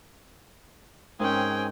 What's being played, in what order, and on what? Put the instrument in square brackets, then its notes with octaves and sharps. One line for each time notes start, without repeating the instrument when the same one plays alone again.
[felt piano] G#2 A#4 [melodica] C4 G#4 G#5 [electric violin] C#4 G5